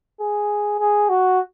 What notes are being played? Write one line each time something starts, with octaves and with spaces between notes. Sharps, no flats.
G#4
G#4
F#4